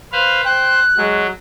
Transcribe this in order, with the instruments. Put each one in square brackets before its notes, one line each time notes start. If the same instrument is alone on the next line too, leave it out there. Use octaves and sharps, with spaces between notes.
[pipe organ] B4 C5 F5
[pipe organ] C5 [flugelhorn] G5 [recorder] F#6
[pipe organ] F#3 [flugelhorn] G#3